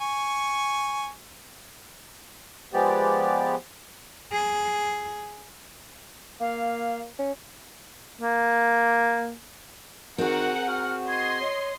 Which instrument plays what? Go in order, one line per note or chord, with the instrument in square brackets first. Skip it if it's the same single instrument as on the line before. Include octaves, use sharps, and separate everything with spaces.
[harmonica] G#5 C#6
[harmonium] F3 G#3 B3 G4 D5
[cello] G#4
[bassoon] A#3 [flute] F5
[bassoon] C#4
[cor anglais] A#3
[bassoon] D#3 [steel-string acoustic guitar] C4 G#4 [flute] F#4 [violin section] A#4 F#5
[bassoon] F#4 [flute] F6
[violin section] D#5 C6 [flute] G#6
[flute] C#5